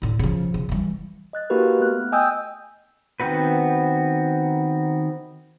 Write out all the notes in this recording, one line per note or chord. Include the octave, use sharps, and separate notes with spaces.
A2 D3
C#3 F3
C#3
E3 G3
D#5 F#6 A6
A#3 E4 F#4 G4 A#4 B4
A3 B3 F6 F#6
D#5 G5 G#5 D#6 E6 G6
D#3 B3 C4 F#4 B4